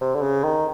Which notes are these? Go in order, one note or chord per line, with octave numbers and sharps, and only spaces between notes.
C3
D3
C#3
D#3